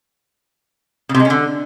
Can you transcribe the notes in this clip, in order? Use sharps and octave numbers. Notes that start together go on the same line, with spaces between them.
C#3
C3
G#3
C#4
D3